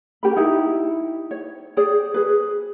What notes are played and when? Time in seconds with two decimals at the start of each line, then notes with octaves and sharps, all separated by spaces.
0.23 C#4 G4 A#4 B5
0.36 D#4 E4 G4
1.31 C#5
1.77 G#4 C#5 D5 G5
2.14 G#4 B4